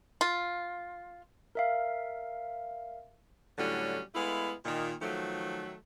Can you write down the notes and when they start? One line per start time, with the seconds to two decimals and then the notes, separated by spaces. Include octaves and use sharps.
0.21 F4
1.55 A#4 E5 F5
3.58 A2 D3 F#3 G3 C#4
4.14 G#3 A3 B3 E4 F5
4.65 A#2 D#3
5.02 D#3 F3 F#3 A3